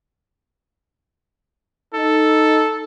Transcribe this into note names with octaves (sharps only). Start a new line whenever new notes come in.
D#4 A4